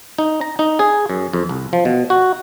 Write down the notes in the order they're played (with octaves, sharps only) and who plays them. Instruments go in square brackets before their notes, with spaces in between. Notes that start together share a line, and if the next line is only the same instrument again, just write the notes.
[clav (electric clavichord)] D#4
A#5
D#4
G#4
F#2
F2
C2
F3
B2
F#4